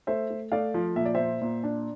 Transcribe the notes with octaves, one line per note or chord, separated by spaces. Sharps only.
A3 C5 E5
A3
A3 D5 F5
F3
A#2 E5
D5
A#2 C5 E5
A#2
D4